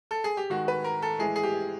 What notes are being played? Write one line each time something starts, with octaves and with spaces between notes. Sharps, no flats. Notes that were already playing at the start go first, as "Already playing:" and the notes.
A4
G#4
G4
D#3 G#3 F#4
B4
A#4
A4
A2 E3 G#3 G#4
G#4
G4